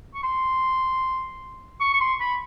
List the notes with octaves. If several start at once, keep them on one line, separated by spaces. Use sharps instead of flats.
C#6
C6
C#6
C#6
C6
B5